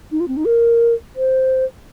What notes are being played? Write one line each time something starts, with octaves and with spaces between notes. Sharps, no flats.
D#4
F4
C4
D#4
A#4
C5